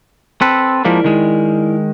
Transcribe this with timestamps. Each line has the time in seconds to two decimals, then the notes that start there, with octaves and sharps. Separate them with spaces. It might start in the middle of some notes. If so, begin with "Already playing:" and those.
0.41 C4 A4 B4
0.85 F3 G#3 A#3 E4 A#4 D5
1.04 D#3 G#3